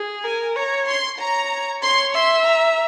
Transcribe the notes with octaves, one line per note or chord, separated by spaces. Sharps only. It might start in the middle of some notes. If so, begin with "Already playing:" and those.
Already playing: G#4
A#4 G#5
C#5 A#5
C6
C#5 A#5
C#5 C6
E5 C6
A#5